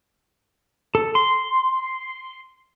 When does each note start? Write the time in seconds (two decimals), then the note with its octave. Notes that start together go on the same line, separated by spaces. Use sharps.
0.95 A4
1.15 C6